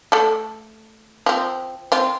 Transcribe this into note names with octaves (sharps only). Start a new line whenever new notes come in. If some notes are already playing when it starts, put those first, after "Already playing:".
A3 A4
F3 C4
C4 F4